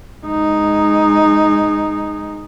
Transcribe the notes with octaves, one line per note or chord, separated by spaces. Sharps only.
G#3 D#4